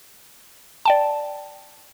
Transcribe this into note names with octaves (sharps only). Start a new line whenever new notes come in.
D5 G5 A5